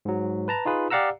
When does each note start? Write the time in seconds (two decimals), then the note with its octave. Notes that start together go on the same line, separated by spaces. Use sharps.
0.05 G#2 F#3
0.48 B4 A5 A#5
0.65 D#4 F4 G#4 B4
0.90 G4 D5 F5 F#5 A#5 E6